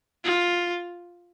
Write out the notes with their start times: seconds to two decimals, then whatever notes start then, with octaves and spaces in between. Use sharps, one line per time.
0.25 F4